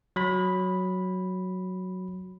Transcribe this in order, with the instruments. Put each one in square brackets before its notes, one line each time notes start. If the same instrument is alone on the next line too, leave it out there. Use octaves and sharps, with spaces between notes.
[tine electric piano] F#3 B5